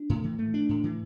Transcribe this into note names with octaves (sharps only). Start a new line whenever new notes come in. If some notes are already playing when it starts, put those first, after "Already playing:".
Already playing: D4
A2
E3
A3
D4
A2
E3